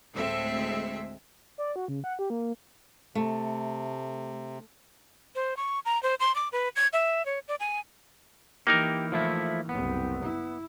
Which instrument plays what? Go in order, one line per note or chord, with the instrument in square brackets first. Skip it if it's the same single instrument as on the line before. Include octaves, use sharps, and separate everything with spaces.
[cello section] D2 A2 G#3 C4 A4 E5
[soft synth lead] D5
F#4
C#3
F#5
G4
A#3
[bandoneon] C3 [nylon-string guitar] A3
[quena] C5
C#6
A#5
C5
C6
D6
B4
G#6
E5
C#5
D5
G#5
[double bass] E3 [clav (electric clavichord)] A#3 D#4 A#4 [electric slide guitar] G4
[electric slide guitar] F3 A3 E4
[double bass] F#1 C2 [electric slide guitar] B3
[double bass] E4